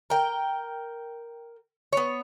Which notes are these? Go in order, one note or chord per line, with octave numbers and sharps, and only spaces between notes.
A#4 G5
B3 C#5